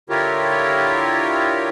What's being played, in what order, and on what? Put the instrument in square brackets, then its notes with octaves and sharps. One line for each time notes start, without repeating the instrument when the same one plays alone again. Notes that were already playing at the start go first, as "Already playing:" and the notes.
[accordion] D3 E4 F4 G4 A#4 C#5